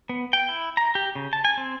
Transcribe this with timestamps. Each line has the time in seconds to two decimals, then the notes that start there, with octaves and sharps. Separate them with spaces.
0.09 B3
0.33 G5
0.48 E4
0.77 A#5
0.95 G4
1.15 C#3
1.33 A5
1.45 G#5
1.57 C4